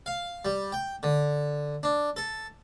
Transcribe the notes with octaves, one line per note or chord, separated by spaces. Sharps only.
F5
G3
G5
D3
D4
A4